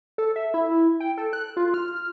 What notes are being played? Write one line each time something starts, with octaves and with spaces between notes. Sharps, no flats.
A4
E5
E4
G5
A4
F#6
F4
F6